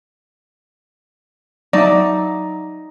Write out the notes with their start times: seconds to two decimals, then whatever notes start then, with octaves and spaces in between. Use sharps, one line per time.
1.73 F#3 D#4 D5 E5